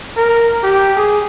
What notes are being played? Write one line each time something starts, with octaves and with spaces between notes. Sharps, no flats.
A#4
G4
G#4